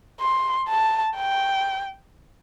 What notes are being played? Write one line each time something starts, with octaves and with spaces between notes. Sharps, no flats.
C6
A5
G5